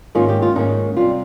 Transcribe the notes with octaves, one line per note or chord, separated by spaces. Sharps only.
G#2 D#3 A#3 C#4 F4
G4
F4
G#2 D#3 A#3 C#4 D#4
C3 G3 C4 F4